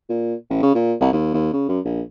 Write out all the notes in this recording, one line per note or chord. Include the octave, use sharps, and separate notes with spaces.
A#2
A1
C#3
A#2
C2
D#2
D#2
C#3
F#2
A#1